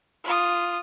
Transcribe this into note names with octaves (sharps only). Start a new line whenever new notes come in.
F4 D#6